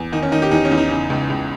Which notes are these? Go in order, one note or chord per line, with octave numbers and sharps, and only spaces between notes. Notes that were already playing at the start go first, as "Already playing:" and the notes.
Already playing: E2
D#3 D#4
C#4
D#3 D#4
G4
E2 D#4
C#4
E2
D#4
C#3
C#2
C#2